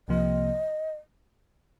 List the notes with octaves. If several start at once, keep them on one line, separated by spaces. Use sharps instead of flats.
C2 C3 F3 A#3 D#5